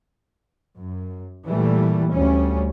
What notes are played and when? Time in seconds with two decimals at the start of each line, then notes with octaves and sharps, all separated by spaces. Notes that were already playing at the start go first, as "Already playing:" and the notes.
0.77 F#2
1.47 A#2 E3 G3 A3
2.13 D2 G3 C#4